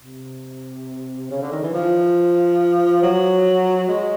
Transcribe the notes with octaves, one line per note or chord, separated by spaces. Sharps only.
C3
C#3
D3
D#3
E3
F3
F#3
G#3